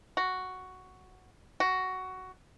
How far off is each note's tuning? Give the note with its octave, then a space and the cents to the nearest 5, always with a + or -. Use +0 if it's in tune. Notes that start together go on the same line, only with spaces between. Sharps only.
F#4 +5
F#4 +10